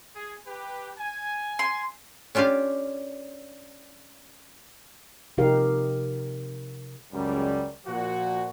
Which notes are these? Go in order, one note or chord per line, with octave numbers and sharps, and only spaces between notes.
G#4
G4 B4
G#5
C6
C#4 D4 F4 G4 F5
C3 F3 D#4 G4 A#4 F5
C#2 F#2 G3
A#2 F3 F#4